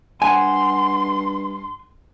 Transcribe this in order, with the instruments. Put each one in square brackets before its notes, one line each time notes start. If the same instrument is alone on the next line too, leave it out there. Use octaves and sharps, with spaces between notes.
[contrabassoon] G2 [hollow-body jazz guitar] F#5 G#5 [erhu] C6